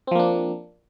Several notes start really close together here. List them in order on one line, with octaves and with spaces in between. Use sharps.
C4 F3 A#3 D4